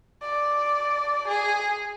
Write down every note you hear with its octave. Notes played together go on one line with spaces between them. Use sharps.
D5
G#4